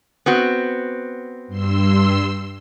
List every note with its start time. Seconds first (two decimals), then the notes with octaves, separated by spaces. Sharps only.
0.26 B3 C4 F#4
1.47 G2 C6 E6